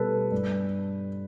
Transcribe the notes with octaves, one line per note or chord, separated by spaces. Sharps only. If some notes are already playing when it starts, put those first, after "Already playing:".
Already playing: B2 G3 A4 B4
G2